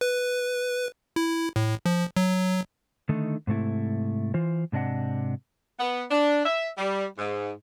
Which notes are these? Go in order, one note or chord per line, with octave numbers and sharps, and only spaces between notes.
B4
E4
A2
F3
F#3
D3 D#3 A3 D#4
G#2 C3 A3 E4
E3 F4 C5
G#2 C3 D4 D#5 F#5
B3
D4
E5
G3
G#2